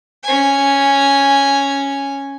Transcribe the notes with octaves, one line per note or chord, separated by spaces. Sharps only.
C#4 G#5